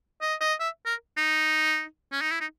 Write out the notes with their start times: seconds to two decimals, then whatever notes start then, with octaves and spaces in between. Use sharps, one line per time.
0.21 D#5
0.41 D#5
0.60 E5
0.86 A#4
1.17 D#4
2.12 C#4
2.22 D#4
2.31 E4
2.41 D#4